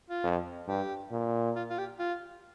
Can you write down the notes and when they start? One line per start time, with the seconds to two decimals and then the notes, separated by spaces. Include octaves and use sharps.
0.10 F4
0.24 F2
0.67 G2 G4
1.11 A#2
1.56 F4
1.70 F4
1.78 G4
1.99 F4